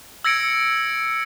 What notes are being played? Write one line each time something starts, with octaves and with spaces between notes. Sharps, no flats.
E6 G#6 A#6 C#7 D7